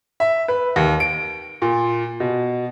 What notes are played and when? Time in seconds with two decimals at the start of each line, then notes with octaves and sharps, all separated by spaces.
0.20 E5
0.48 B4
0.76 D#2
1.00 D7
1.62 A#2
2.20 B2